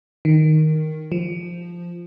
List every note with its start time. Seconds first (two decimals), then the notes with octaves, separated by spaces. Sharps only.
0.25 D#3
1.12 F3